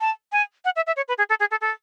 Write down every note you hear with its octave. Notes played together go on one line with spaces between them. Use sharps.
A5
G#5
F#5
E5
E5
C#5
B4
G#4
A4
G#4
A4
A4